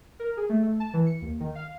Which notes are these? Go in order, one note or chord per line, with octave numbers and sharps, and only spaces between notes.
A#4
G#4
A3
A3
A5
E3
C#7
D#2
D#3
F5